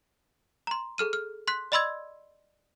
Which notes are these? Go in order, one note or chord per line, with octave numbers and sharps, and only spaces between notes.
A#5 C6
G#4 A4 F6 D#7
F6
C6 F#6 B6
D5 D#5 B5 C6 E6 G#6